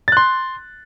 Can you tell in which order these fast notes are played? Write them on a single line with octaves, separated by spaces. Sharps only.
A6 F#6 C6